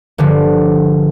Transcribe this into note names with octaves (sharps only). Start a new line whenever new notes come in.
G1 D3 F3